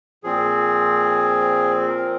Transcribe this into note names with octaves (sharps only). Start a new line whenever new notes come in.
A#2 F3 C4 G#4
A#4